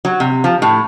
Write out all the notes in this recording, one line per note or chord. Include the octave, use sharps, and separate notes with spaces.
F#3
C3
F3
A2